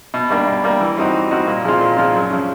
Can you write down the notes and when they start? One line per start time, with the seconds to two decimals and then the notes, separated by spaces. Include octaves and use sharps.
0.14 B2
0.30 G3 A#3 D4
0.47 B2
0.64 G3 A#3 D4
0.81 E3
0.98 G3 C4 D#4 F#4
1.14 E3
1.31 G3 C4 D#4 F#4
1.47 A#2
1.64 F3 G#3 C4 F4
1.81 A#2
1.97 F3 G#3 C4 F4
2.14 F#2
2.31 C#3 F3